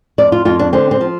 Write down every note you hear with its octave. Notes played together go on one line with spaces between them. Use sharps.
F2 D5
F4
F2 F4
D4
D3 C4
C4
F3